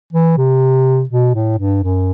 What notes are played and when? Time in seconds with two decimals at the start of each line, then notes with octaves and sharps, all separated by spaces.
0.13 E3
0.38 C3
1.09 B2
1.35 A2
1.58 G2
1.83 F#2